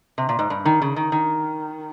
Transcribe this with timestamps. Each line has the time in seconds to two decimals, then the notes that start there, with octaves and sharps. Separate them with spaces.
0.18 C3
0.29 A#2
0.39 G#2
0.50 G2
0.65 D#3
0.82 C#3
0.96 D#3
1.12 D#3